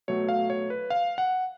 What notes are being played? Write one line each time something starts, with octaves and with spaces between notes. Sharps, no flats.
B2 F#3 A3 C#5
F5
C#5
B4
F5
F#5